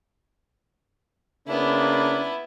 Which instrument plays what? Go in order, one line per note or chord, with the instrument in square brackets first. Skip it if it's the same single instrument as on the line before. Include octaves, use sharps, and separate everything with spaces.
[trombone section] C#3 A#3 D4 [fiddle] B3 E4